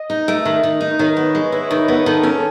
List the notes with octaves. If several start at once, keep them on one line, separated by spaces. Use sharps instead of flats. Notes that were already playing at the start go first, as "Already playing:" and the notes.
Already playing: D#5
D#4
A3
D#3
D#3
D#4
D#3 C#5
B3 B4
C#5
G#3 D#5
E4 B4
C#5
D#3
D#5
B3 B4
D#3 A4
C#4 G#4